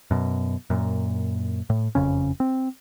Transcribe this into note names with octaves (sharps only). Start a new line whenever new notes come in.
F#2 B2
F#2 A#2
A2
F#1 F2 C#3 C#4
C4